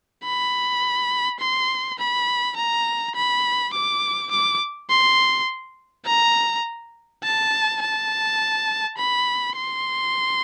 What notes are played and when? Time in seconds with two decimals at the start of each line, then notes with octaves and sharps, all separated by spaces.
0.24 B5
1.40 C6
1.99 B5
2.57 A#5
3.16 B5
3.74 D6
4.31 D6
4.90 C6
6.06 A#5
7.24 A5
7.82 A5
8.98 B5
9.57 C6